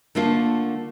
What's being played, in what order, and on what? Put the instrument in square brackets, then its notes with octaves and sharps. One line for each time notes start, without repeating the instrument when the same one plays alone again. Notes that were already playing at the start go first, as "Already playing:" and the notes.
[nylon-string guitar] D3 A3 A#3 F4